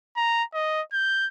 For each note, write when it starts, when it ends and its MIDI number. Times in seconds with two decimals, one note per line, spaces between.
0.17 0.43 82
0.54 0.82 75
0.93 1.28 91